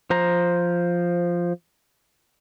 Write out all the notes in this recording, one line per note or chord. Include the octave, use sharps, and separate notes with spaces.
F3 C5 A#5